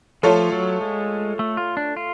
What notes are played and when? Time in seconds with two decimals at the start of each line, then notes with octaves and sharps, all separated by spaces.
0.23 F3 A3 F4 A4 C#5
0.52 F#3
0.81 G#3
1.39 A3
1.57 F4
1.77 D4
1.97 F4